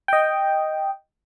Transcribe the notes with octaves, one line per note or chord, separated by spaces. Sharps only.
D#5 G5